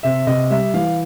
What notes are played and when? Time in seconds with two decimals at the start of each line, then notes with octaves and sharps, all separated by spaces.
0.03 C3 E5
0.27 C3 D#5
0.50 G3 E5
0.74 E3 F5